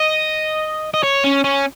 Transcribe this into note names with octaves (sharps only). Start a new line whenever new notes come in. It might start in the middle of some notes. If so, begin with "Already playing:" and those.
Already playing: D#5
D#5
C#5
C#4
C#4